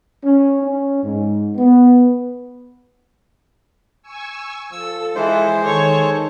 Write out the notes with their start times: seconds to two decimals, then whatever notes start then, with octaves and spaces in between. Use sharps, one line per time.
0.24 C#4
0.62 C#4
1.03 G#2
1.56 B3
4.03 G#5 C#6 E6
4.72 F3 A4 E6
5.16 E3 G#3 C5
5.64 D#3 A4 C#5